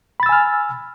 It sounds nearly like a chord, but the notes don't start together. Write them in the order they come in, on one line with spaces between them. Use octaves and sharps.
B5 A6 E6 G#5 F6